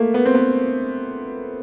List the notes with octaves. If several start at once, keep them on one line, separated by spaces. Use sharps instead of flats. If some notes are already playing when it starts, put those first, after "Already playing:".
Already playing: A3 A#3
B3
C4
B3